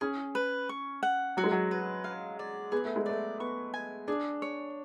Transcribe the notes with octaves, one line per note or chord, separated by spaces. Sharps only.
C#4 G#4
B4
C#6
F#5
F#3 F#4
G#3
F#3
B4
F5
D5
B3 G#4
A3
G#3
A3 D5
B3 C#6
G#5
D4 G#4
C#5